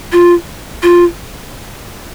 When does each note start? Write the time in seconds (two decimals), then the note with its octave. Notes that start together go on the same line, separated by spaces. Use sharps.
0.12 F4
0.83 F4